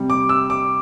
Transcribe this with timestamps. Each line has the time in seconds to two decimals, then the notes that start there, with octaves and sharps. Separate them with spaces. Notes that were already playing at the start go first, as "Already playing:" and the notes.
Already playing: C3 G3
0.10 D6
0.29 E6
0.50 D6